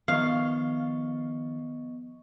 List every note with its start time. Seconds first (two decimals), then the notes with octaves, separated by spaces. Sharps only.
0.08 D#3 F3 B3 D#5 F5 C#6